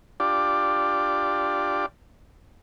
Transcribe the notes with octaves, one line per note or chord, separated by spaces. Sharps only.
D4 F4 G4 D5